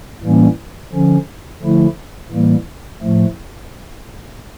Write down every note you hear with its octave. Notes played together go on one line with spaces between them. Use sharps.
A2 E3 G3 A#3 C#4
D3 F3 C#4
D3 F3 A3 E4
A2 E3 G3 A#3
A2 F3 A3